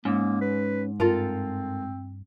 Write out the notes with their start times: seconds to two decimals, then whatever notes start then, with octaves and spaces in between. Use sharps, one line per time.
0.05 G#2 A#3 C#4
0.41 B4
1.00 G2 C4 F4 A4 A#4